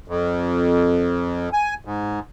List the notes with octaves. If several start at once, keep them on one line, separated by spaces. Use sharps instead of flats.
F2
G#5
G#2